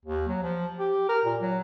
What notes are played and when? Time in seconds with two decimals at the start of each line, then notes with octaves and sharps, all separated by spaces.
0.05 D#2
0.28 F#3
0.42 F3
0.79 G4
1.09 A#4
1.25 A#2
1.41 F#3